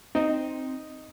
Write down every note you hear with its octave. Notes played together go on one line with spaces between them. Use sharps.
C4 D#4